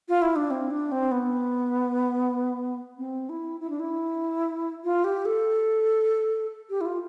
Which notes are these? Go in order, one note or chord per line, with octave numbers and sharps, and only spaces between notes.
F4
E4
D4
C4
D4
C4
B3
C4
E4
E4
D4
E4
F4
G4
A4
G4
E4
F4